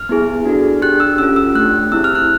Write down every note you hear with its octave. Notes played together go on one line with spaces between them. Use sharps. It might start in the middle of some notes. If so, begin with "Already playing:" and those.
Already playing: F6
B3 E4 G#4
D4 F#4 A4
D4 G4 F#6
E6
C#4 F4 A4 E6
E6
A3 D4 G4 F#6
C4 E4 G#4 E6
F6
F#6